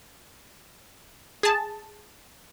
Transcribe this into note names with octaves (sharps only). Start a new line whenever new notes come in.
G#4 A5